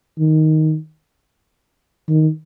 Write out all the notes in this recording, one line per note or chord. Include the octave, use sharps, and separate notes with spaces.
D#3
D#3